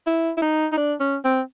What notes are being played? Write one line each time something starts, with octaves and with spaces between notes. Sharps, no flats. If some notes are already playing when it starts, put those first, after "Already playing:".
E4
E4
D#4
D#4
D4
C#4
C4